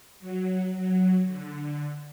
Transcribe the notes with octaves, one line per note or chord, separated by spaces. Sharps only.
F#3
F#3
D3